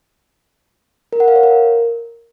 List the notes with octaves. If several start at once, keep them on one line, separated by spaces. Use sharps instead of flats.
A#4
F#5
F5
C#5
A#4